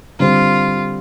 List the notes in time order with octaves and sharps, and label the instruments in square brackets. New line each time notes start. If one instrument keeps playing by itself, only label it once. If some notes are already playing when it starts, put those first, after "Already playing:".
[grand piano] D3 G3 C4 [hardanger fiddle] F4